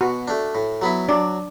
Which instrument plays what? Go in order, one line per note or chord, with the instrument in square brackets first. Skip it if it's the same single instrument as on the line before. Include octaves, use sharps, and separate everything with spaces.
[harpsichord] B2 [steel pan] F#4
[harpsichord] A3 D4
A2
F#3 B3 E4
[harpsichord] F#3 [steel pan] D4 D5